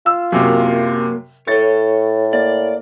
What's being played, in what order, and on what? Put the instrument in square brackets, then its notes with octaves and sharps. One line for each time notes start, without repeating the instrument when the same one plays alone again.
[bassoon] F4 [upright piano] E6
[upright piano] F#2 C3 [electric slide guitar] F#3 A#3
[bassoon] A2 [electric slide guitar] A4 C#5 [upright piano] A6
[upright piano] A#3 [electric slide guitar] D5